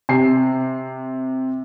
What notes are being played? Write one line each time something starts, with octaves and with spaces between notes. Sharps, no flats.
C3 C7